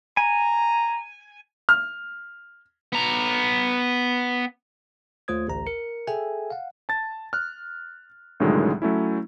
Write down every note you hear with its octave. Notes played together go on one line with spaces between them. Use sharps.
G#5 A#5
F6
B3 A#5
D#2 A3 F4 C5 D#6 G#6
A1 D2 A#5
A#4 C#7
G#4 A4 E5 G5 G#5
F5 F#5
A5 A6
F6 F#6
C2 A2 D3 D#3 F#3 G#3
F#3 A3 C#4 E4